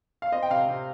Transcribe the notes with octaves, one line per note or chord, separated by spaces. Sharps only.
F5
C4 D#5
G5
C3 F5
C3